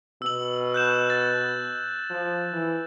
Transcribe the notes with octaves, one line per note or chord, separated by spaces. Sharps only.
B2 E6 F#7
F#6 G6 E7
A6
F3
E3